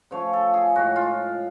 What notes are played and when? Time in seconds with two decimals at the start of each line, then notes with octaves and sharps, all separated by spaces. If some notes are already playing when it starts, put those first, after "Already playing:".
0.11 C#3 F3 A3 C#5
0.33 A4
0.54 G#4
0.75 A2 G#3 F#4
0.96 F4